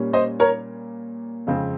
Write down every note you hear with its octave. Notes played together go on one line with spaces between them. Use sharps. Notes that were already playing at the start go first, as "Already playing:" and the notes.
Already playing: A#2 G3 C#4
C5 D#5
A#4 C#5
F2 C#3 G#3 C4